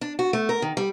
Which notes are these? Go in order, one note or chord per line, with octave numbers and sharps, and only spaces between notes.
D4
F#4
A3
A#4
D#3
G3